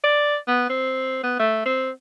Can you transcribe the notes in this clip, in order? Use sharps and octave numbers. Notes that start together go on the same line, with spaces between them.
D5
B3
C4
B3
A3
C4